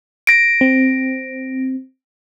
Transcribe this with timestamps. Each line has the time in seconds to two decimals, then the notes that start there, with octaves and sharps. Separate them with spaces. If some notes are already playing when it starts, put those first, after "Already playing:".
0.27 A#6 D7
0.61 C4